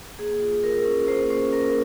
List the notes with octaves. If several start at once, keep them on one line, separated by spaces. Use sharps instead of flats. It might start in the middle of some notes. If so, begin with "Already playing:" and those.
A#3 G#4
F4
F4 A#4
C#4
A#3 C5
C#4 C5
A#3 A#4